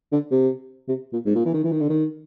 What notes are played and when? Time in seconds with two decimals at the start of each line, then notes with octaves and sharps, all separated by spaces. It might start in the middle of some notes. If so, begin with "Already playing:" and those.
0.12 D3
0.31 C3
0.88 C3
1.13 A#2
1.26 G#2
1.35 A#2
1.45 E3
1.54 D#3
1.64 E3
1.72 D#3
1.80 D3
1.89 D#3